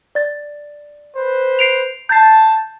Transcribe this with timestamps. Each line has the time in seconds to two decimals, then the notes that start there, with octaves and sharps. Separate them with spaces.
0.15 D5 A6
1.16 B4 C5
1.59 C7 D7 F7
2.09 A5 G6 A6 C7